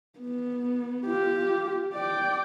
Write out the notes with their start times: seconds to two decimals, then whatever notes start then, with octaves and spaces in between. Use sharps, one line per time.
0.19 B3
1.06 F4 G4
1.94 D5 G5